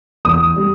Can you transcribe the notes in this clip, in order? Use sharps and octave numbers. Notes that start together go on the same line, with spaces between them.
E2 D#6
G3